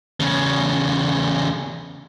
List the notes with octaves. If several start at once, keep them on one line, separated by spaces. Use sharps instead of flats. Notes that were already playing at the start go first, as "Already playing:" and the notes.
E2 C#3